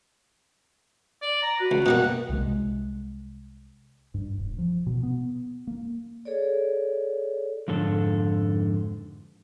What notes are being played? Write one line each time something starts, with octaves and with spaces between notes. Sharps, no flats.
D5
A#5
F#4 B4
C#2
B2 G3 A#3 F#5
C2 C3 G#3
G2
D#1
F3
B2
B3
A#3
G#4 A4 C#5 D5
F2 G#2 D3 A4